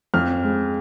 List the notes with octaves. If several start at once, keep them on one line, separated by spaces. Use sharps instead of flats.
F2 F6
G#3